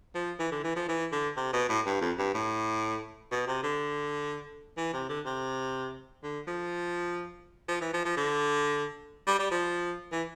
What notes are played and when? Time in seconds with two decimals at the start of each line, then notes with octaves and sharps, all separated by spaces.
0.15 F3
0.39 E3
0.52 D3
0.64 E3
0.76 F3
0.88 E3
1.12 D3
1.37 C3
1.53 B2
1.69 A2
1.86 G2
2.01 F2
2.18 G2
2.34 A2
3.31 B2
3.47 C3
3.63 D3
4.77 E3
4.93 C3
5.09 D3
5.25 C3
6.23 D3
6.47 F3
7.68 F3
7.81 E3
7.93 F3
8.05 F3
8.17 D3
9.27 G3
9.39 G3
9.51 F3
10.12 E3